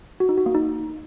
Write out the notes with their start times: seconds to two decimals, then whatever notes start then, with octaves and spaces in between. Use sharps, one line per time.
0.20 F#4
0.29 D#4
0.38 F#4
0.46 A#3
0.55 D#4